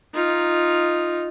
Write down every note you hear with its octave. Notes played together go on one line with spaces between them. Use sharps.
D#4 F4